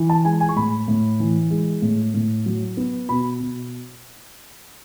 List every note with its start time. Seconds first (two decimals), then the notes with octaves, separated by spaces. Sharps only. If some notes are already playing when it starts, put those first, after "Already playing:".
Already playing: E3
0.10 A5
0.25 G#3 G#5
0.40 G#5
0.49 C#6
0.56 A2 B5
0.88 A2
1.20 E3
1.50 G#3
1.82 A2
2.14 A2
2.46 F#3
2.77 B3
3.09 B2 B5
3.40 B2